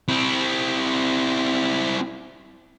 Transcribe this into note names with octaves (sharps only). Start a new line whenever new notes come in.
C4 E4